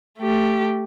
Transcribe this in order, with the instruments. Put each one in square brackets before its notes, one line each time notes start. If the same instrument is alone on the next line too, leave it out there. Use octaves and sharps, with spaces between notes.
[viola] A3 G4